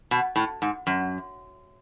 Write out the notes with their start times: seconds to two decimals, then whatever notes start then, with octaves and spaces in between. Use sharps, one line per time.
0.11 B2
0.36 A2
0.62 G#2
0.87 F#2